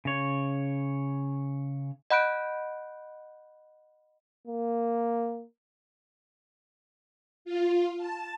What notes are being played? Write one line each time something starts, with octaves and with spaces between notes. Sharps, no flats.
C#3 C#5
D#5 F#5 B5 F#6 G6 D7
A#3
F4
A5